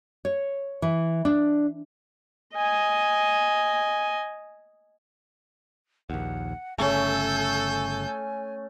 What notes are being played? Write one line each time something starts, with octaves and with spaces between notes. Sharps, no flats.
C#5
E3
D4
D#5 G#5
A#1 D#2 F#5
G1 C#3 A3 C#4 A4 G#5 G6